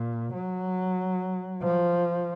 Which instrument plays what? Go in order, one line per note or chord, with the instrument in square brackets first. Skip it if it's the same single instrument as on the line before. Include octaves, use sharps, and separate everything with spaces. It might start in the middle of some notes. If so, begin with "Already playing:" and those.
Already playing: [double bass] A#2
F#3
F3